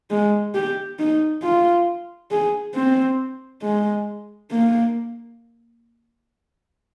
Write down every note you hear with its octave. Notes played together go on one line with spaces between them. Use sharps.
G#3
G4
D#4
F4
G#4
C4
G#3
A#3